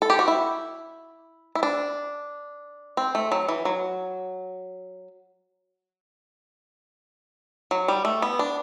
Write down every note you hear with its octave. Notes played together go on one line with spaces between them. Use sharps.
A4
G4
F#4
E4
E4
D4
C4
A3
F#3
E3
F#3
F#3
G3
A3
B3
D4